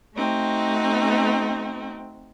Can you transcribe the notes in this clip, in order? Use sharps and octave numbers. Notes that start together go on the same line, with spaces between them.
A3 C4 D#4 F#4